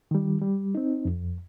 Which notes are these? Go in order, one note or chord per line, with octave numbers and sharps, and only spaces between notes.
D#3 G3
G3
C4 D#4
F2